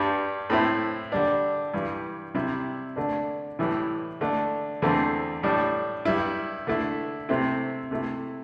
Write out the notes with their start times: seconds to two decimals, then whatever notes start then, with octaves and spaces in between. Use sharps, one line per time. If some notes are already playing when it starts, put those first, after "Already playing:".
Already playing: G2 G3 D4
0.50 A2 A3 C4 E4
1.12 D3 G3 D4
1.74 G2 E3 G3
2.34 C3 G3 E4
2.96 D3 A3 D4
3.59 A2 E3 G3 E4
4.21 D3 A3 D4
4.82 E2 D3 A3 C4
5.43 A2 G3 D4
6.05 G2 G3 E4
6.67 D3 A3 E4
7.29 C3 A3 C4 E4
7.91 C3 A3 E4